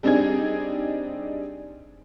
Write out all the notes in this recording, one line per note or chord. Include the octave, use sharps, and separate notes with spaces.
G3 C4 D4 D#4 G#4 G#6